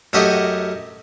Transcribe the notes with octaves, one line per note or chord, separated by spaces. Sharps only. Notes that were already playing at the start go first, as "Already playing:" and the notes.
F#2 A3 F#4 G4 D#5